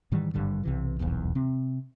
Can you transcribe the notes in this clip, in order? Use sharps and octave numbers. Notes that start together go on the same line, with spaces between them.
G#2 D#3 E3 G3
G#1 G2 D3 G3
B1 C3 E3
D#1 B1 E2
C3 C4